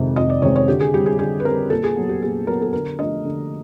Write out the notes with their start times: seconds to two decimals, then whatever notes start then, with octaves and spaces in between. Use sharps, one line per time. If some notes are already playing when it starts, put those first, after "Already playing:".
Already playing: F2 C3 D#3 G#3 C4
0.16 F2 D#5
0.30 D5
0.42 C3 D#3 G#3 C4 C#5
0.56 C#5
0.68 D3 G4
0.80 G#4
0.94 G3 C4 G4
1.06 G#4
1.19 D3 G#4
1.40 B4
1.45 G3 C4 A#4
1.70 A#2 A4
1.84 G#4
1.96 F#3 B3
2.09 G4
2.22 A#2 G#4
2.47 F#3 B3 A#4
2.62 A4
2.73 D3 A#4
2.99 F3 A3 D4 D#5
3.25 D3